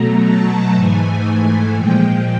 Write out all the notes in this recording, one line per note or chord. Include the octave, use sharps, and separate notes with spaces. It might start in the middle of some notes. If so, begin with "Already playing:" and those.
Already playing: B2 F#3 A3 A#5
A5
G#2 E3 A3 G#5
A#2 F3 G#3 G5